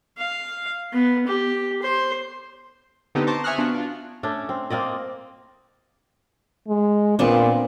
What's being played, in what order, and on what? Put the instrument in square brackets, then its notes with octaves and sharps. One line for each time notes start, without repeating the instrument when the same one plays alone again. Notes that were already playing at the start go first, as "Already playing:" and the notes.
[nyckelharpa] F5
B3
G4
C5
[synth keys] D3 B3 C4 D#4 G4
C5 A5 A#5 C#6 D6
E5 G#5 C#6 D#6 F6 F#6
B3 D4 F4 F#4
D4 F4
[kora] A3 C#4 D4
C4
A#3 C4 D5 D#5
[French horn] G#3
[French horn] A#2 [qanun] B3 C4 D4